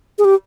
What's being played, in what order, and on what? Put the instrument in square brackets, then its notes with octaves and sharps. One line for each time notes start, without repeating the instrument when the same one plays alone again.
[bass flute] G#4
G4